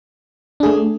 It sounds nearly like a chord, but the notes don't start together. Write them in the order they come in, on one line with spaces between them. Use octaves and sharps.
D4 G#4 A3